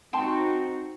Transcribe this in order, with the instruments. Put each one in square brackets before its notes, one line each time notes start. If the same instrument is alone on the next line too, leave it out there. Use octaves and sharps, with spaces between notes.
[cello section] C4 D#4 F#4 [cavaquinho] G5 A5 C6